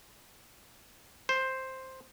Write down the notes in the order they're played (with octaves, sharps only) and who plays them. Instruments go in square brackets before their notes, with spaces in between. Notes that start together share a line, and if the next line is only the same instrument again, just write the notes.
[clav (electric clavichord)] C5